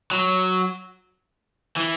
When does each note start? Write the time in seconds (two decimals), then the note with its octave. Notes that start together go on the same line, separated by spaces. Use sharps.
0.12 F#3
1.76 E3